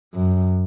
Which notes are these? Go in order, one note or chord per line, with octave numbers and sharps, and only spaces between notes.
F#2